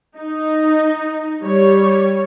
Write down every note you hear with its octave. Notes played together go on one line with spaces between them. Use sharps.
D#4
G3 C#5